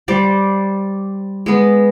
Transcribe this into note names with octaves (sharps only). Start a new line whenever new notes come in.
G3 C5 D5
G#3 B3